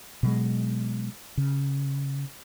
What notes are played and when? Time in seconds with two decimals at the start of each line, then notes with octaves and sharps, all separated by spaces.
0.23 B2 F#3 G#3
1.37 C#3